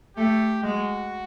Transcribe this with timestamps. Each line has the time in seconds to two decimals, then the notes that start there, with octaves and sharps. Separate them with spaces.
0.17 A3 G4
0.63 G#3 F#4